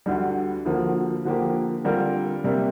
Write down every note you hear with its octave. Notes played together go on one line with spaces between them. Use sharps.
D2 D3 G3
D2 D3 F3 A#3
D3 F3 A#3 G4
D3 G3 C4 F4 A#4
C3 G3 A#3